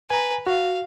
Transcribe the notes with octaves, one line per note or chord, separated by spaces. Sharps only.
B4 G#5 A#5
F#4 F5